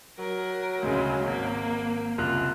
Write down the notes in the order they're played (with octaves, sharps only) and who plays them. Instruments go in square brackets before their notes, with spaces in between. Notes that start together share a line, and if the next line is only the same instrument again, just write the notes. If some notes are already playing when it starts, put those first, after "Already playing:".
[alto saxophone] F#3 [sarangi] A#4
[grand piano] D2 C#3 [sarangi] G#3
[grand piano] G#1 [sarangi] A#3
[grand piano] F#1 C2 F#6 [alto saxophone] F4